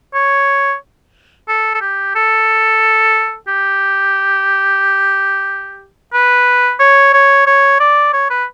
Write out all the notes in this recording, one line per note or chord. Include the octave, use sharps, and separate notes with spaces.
C#5
A4
A4
G4
A4
G4
B4
C#5
C#5
C#5
D5
C#5
B4